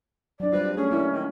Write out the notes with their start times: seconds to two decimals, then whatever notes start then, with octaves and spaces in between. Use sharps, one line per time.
0.40 F#3 D4 D5
0.52 G3 C4 F4 B4
0.76 A3 C#4 G#4
0.91 E3 G3 A#3 E4 A#4
1.11 D#3